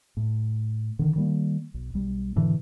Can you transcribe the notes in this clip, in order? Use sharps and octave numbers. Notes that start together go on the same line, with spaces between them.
A2
D3 D#3
D#3 G3 A#3
B1
B1 G3
G#2 B2 D3 E3